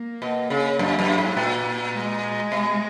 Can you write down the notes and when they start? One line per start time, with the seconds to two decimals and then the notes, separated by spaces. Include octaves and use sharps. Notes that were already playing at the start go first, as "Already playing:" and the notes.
Already playing: A#3
0.22 B2
0.50 C#3
0.79 F#2
0.99 F#2
1.18 G#2
1.37 A#2
1.94 G#3
2.52 B2